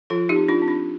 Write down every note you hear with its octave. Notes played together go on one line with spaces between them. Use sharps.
F3 F4 A4
D#4 G4
C4
D4 F4
C4
D4